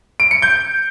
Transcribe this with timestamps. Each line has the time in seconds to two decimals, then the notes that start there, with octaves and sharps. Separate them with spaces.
0.20 D7
0.31 C#7
0.42 G6